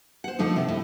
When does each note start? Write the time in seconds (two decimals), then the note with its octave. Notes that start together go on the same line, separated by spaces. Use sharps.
0.24 C5 F#5
0.39 D3 F3 A3 D#4
0.56 C3
0.68 A2